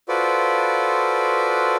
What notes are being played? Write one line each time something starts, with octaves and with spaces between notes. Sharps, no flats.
F4 F#4 A4 B4 C5 D5